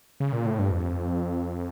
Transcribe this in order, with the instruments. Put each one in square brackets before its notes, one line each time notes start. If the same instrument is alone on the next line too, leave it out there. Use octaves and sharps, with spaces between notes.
[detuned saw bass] C#3
A#2
A2
G2
F2